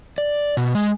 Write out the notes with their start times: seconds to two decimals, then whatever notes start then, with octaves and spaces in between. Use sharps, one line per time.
0.18 D5
0.57 B2
0.75 G#3